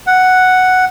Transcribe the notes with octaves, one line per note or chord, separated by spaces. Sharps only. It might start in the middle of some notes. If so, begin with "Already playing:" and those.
F#5